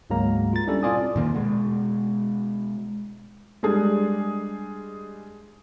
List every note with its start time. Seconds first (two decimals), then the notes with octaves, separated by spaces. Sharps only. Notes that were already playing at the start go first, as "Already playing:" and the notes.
0.10 D2 G#2 F#3 G#3 A#3 A#5
0.53 F4 A6
0.67 G3 C#4 D4 E4 A4 D5
0.83 B2 C4 F4 D5 G#5 D#6
1.16 A#2 D#3 A#3
1.34 B2 G#3
3.63 G3 G#3 D4 G#4